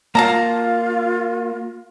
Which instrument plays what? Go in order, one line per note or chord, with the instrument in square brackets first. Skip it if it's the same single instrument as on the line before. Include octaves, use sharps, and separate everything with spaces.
[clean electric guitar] A#3 [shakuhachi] F4 [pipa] F5 A5 A#5